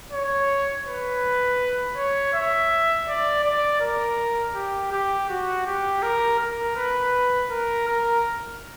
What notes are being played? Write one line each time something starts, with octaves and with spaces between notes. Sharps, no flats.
C#5
B4
C#5
E5
D5
D5
A#4
G4
G4
F#4
G4
A#4
A#4
B4
A#4
A#4